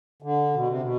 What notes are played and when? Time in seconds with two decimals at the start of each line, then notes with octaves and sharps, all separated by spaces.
0.22 D3
0.54 B2
0.67 C3
0.81 B2